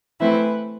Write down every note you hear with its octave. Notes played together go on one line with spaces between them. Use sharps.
E3 A3 C4 E4 B4